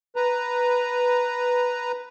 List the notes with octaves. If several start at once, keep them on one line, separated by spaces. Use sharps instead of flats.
B4 A#5